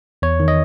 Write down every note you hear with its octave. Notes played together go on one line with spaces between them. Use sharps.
E2 C#5
D#3
D#5